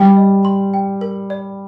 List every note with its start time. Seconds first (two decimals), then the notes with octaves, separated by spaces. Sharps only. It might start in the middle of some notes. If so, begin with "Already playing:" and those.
Already playing: G3 G5
0.17 D#5
0.45 C6
0.74 G5
1.01 A#4
1.30 D5